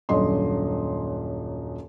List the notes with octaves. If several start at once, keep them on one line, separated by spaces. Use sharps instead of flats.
D#1 F#2 D4 D#5 C6